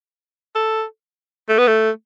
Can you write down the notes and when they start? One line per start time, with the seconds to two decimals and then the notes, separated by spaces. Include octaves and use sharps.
0.55 A4
1.49 A3
1.58 B3
1.68 A3